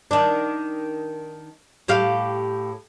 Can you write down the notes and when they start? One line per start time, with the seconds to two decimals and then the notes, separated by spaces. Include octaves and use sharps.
0.11 D#3 D4
1.88 A2 G4 F5